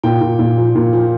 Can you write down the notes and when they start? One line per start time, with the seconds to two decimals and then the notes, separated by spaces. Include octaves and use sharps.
0.03 A#2 G5
0.21 A#2
0.39 A#2
0.58 F3
0.75 A#2
0.93 F3